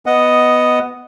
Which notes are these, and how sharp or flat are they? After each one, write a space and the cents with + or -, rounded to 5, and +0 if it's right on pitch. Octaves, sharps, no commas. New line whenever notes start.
B3 +5 D#5 +0 F#5 +0